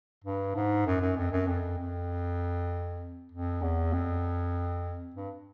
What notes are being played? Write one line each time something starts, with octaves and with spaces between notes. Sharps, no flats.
G2
G#2
F#2
F#2
F2
F#2
F2
F2
F2
E2
F2
G2